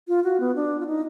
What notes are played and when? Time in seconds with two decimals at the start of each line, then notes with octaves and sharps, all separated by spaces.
0.08 F4
0.24 F#4
0.40 B3
0.55 D4
0.80 F4
0.87 D#4